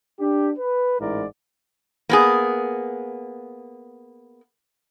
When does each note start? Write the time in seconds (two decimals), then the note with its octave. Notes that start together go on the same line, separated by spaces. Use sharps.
0.20 D4 G4
0.58 B4
0.99 A1 G#2 E4 A#4 D5
2.09 A#3 B3 G#4